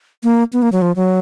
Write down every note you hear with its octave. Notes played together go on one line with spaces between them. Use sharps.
A#3
B3
A#3
F#3
F3
F#3